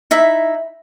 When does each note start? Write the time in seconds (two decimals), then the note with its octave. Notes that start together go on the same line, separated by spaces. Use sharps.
0.11 D#4 E4 E5